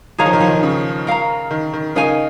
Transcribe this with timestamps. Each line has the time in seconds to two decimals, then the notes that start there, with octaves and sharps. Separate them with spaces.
0.18 D#3 G#4 C#5 F5 A#5
0.26 F3
0.33 D#3
0.41 F3
0.48 D#3
0.63 C#3
1.07 A#4 F5 A#5
1.51 D#3
1.73 D#3
1.95 C#3 D#4 A#4 F5 G#5